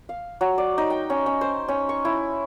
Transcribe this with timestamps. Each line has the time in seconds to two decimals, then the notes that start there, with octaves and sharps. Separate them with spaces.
0.09 F5
0.41 F#3
0.58 D5
0.78 D#4
0.90 G5
1.10 C#4
1.26 C#4
1.41 C5
1.68 C#4
1.89 C#6
2.05 E4